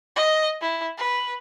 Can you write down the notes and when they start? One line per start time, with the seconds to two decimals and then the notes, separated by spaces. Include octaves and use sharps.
0.16 D#5
0.61 E4
0.98 B4